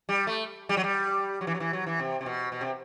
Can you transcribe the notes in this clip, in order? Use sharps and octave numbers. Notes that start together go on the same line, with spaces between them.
G3
A3
G3
F#3
G3
F#3
E3
F#3
E3
F#3
E3
C3
C3
B2
B2
C3